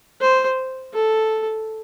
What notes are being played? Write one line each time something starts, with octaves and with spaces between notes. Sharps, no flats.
C5
A4